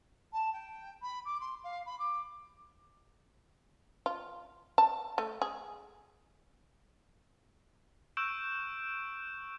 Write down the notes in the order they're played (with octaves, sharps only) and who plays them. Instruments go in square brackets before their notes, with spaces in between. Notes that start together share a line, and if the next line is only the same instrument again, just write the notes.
[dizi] A5
G5
B5
D6
C6
F5
B5
D6
[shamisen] F4
A5
A3
G#4
[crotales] C#6 E6 F#6 G6 D7 E7